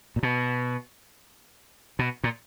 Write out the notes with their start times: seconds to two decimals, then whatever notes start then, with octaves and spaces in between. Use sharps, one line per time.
0.16 A#2
0.23 B2
1.99 B2
2.24 A#2